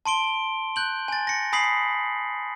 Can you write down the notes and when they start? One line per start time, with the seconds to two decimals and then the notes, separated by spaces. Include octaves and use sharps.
0.05 A5 C6 D7 G7
0.76 F#6 G6 F#7
1.08 G#5 A6
1.27 A#6 C#7
1.53 G#5 B5 D#6 B6 C7 F#7